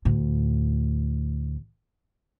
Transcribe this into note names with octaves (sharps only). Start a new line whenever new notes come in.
D2 A2